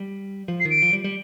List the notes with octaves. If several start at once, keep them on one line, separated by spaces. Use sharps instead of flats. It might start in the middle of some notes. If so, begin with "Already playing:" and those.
Already playing: G3
F3
C7
D#3
D7
F3
G3
G3